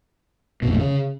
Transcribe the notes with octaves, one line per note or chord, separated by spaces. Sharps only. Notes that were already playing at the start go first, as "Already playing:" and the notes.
B2
F2
A2
C#3